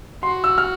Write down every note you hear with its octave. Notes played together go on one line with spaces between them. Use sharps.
F#4 C6
E6
F6